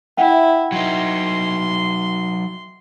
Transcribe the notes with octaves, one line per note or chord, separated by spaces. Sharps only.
E4 E5 F#5 G5
F#3 D#4 C6